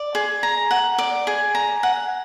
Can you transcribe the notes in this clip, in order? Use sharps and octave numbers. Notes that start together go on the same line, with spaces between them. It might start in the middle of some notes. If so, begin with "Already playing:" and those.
Already playing: D5
G#4
A#5
F#5
D5
G#4
A#5
F#5